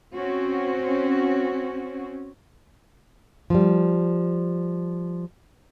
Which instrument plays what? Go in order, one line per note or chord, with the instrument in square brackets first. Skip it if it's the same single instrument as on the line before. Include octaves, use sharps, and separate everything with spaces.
[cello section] C4 C#4 F#4
[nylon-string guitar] F3 G3